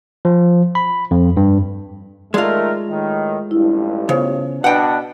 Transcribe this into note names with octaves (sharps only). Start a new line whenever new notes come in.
F3
B5
F2
G2
D#3 G#3 A3 F4 A#4 D5
A2 D#3
A1 G2 E4
C#3 B3 F4 C5
B2 D4 B4 F#5 G5